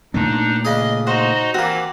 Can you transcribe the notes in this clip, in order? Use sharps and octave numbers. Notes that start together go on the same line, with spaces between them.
A#2 A3 B3 D4 D#4
C#3 D4 G#4 D#5
D#4 F#4 C5 D#5 F#5
E3 A#3 C4 F#4 D5